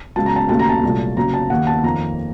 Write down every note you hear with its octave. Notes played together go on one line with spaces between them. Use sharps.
C#2 C#3 F#3 A5
A#5
A5
D#2 C#3 F#3 A3 A5
A#5
A5
C2 A#2 F#3 A3
F#1 F#2 C#3 F#3 A#5
A5
D#2 D#3 A#3 F#5
A5
F2 D#3 A#3 A#5